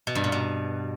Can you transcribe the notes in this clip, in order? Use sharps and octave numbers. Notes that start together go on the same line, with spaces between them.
B2
G2
A#2
B2